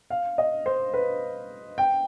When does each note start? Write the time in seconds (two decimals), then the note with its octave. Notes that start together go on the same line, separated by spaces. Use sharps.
0.10 F5
0.38 D#5
0.66 C5
0.94 B4
1.78 G5